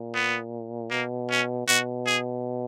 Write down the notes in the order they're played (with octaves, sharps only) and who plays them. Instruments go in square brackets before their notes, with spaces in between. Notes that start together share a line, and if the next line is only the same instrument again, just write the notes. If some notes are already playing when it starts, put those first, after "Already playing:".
Already playing: [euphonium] A#2
[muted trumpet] B3
[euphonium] B2 [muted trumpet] A#3
[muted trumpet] C#4
[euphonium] B2 [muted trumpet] F#4
[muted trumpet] G#4